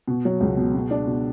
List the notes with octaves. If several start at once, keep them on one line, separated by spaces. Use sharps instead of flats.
B2
F#3
C#2
B2
B2
D4
B2